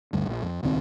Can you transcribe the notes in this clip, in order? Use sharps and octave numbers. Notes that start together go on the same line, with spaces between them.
G1 D2 G2
A#1
F2
D#1 C#2 D#3 C4